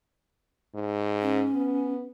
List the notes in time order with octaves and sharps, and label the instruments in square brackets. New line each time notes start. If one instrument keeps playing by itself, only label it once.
[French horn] G#2
[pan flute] C#4
[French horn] B3